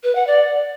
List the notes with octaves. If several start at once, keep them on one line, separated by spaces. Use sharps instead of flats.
B4
F#5
D5